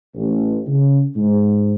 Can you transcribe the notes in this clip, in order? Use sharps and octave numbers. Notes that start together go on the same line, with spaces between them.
A1
C#3
G#2